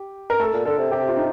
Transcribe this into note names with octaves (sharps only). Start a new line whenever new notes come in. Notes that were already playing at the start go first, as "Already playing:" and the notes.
Already playing: G4
A#4
A3 A4
A#2
D3 A4
C3
C3 G4
F4
D#4